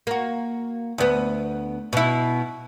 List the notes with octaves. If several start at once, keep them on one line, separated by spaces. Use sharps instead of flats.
A#3 F#4
D2 B3
B2 E4